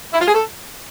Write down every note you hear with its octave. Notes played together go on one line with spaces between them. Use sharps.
E4
F4
G#4
A4